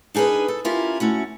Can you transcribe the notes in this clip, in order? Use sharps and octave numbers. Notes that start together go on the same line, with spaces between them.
D4 D#4 G#4 A#4 B4
A4
C#4 E4 F4 G4 A#4
A3 C#4 F#4